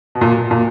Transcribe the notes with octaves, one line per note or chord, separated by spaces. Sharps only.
B2
A#2
A#2